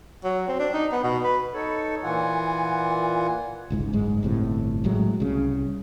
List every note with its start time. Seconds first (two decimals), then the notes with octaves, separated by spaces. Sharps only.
0.24 F#3
0.48 C4
0.59 D4
0.74 D#4
0.92 B3
1.04 B2
1.23 B4
1.54 D#4 A4 C#5
2.03 A#2 E3 F4 F#5 G#5
3.70 G1 C#2 G#2
3.93 F#1 G#2 G#3
4.23 G1 A2 C3
4.84 A#1 A2 F#3 G#3
5.20 C2 C#3